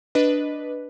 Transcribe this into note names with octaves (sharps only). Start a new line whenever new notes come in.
D4 B4 D#5